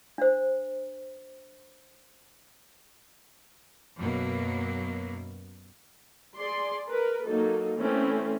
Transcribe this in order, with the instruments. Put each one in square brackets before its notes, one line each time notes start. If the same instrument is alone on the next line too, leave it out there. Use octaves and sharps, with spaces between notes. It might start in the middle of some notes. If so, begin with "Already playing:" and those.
[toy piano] D4 C5
[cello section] F#2 B2 F#3 A#3
[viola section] G#4 D5 C6
A#4 B4
F#3 A#3 D#4 A4
E3 A3 C4 C#4